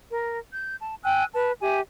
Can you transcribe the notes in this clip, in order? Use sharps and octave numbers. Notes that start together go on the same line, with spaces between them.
A#4
G6
A5
G5 G#5 E6 F#6
B4 A5
G4 E5 G#5